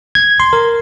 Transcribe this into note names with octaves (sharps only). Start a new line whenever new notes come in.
G#6
C6
A#4